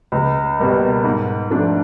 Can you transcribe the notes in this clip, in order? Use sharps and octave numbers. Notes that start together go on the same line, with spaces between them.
C#2
B2 G3 A#3
G#2
F3 A3 D4